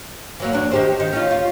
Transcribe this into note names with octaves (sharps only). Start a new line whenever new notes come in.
E3 F#3 A#3
E2 D4
D#3 G4 C5
D#3
C#4 D#4 F4
F4